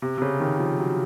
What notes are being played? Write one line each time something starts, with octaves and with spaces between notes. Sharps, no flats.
C3
C3
C#3
D#3
F3
F#3